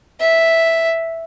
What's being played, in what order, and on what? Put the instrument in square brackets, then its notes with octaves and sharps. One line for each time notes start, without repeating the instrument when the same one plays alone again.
[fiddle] E5